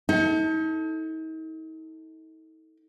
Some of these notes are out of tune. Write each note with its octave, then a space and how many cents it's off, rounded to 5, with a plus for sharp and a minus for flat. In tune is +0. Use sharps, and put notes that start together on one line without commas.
D#4 +40 A4 +0